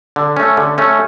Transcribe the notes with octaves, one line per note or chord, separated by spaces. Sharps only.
D3
A3 C#4
D3
A3 C#4